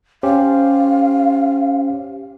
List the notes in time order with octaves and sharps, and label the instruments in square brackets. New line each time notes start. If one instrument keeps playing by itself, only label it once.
[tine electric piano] C#4 G4 C5 [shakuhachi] F5